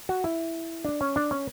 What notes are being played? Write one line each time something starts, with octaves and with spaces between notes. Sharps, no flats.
F#4
E4
D4
C#4
D4
C#4